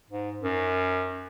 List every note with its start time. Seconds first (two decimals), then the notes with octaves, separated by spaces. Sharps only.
0.10 G#2
0.43 F#2